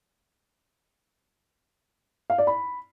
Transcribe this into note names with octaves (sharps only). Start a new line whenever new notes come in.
F5
D5
B5